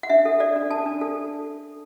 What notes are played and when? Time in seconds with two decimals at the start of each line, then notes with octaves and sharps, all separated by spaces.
0.03 F#5
0.10 D4 E5
0.25 A4
0.40 A4 D5
0.56 D4
0.70 A4 A5
0.86 D4
1.01 A4